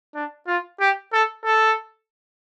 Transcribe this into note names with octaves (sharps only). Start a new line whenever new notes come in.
D4
F4
G4
A4
A4